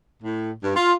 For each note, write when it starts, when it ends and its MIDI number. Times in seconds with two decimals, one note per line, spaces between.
0.23 0.51 45
0.62 0.74 43
0.75 0.92 65